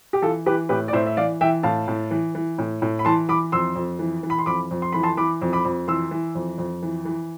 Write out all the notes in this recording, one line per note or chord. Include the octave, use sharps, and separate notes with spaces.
G4
E3 F4 A4
E3 G4 B4
A2 G4 B4
D5
A2 C5 E5
E5
E3 D5 F5
E3 E5 G5
A2 F5 A5
A2
E3
E3
A2
A2
B5
E3 A5 C6
E3 B5 D6
F2 C6 E6
F2
E3
E3
B5
C6
F2 B5 D6
F2
C6
E3 B5
A5 C6
E3 B5 D6
F2
B5 D6
F2
E3 C6 E6
E3
F2
F2
E3
E3